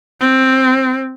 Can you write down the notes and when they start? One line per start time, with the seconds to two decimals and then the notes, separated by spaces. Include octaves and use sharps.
0.21 C4